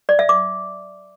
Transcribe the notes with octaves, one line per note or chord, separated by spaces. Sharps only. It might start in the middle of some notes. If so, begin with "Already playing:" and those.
D5
E5
D6